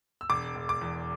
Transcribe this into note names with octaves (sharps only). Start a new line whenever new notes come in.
E6
E1 D6
E1
D6
E2